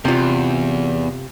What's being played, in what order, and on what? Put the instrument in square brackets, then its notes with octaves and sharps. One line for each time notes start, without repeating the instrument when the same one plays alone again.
[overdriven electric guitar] E2 [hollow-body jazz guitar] C3 F4